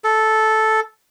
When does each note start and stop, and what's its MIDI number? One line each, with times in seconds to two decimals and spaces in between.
0.04 0.80 69